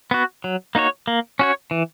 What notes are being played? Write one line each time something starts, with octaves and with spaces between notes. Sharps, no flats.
B3 F#4
F#3
A#3 D#4 F#4 C#5
A#3
C#4 F#4 C#5
E3